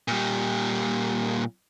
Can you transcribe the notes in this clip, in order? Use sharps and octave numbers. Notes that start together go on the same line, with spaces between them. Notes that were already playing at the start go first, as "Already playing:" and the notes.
A#2 G3